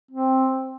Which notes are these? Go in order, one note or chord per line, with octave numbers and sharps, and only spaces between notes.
C4